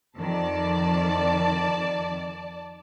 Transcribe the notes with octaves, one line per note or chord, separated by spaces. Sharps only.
F2 D#3 D5 A5